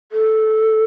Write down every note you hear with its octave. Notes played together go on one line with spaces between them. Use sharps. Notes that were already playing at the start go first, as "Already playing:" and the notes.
A4